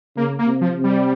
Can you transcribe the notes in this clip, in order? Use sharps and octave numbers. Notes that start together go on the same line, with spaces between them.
C#3 A#3
A#3
C3
F3
C3
G3